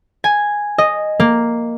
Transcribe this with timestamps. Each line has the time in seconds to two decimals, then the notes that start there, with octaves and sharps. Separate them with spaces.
0.24 G#5
0.78 D#5
1.20 A#3